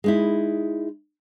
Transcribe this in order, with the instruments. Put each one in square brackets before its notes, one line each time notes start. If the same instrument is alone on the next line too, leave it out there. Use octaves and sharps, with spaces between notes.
[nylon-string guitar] G#3 D#4 E4